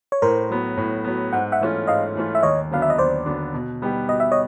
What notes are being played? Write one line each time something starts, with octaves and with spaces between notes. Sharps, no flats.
C#5
A2 A#4 C5
F#3 B3
A2
F#3 B3
G#2 F#5
E5 F#5
E3 A3 C#4 F4
G#2 D#5 F5
E3 A3 C#4 F4
E5
D#2 C#5 D#5
D3 F#3 B3 D4 F5
E5
D#5
D#2 C5 D5
D3 F#3 B3 D4
B2
G3 B3 D#4 G4
B2 D#5
E5
C#5 D#5